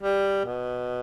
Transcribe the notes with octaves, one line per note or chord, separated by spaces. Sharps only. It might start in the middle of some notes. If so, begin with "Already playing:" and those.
G3
B2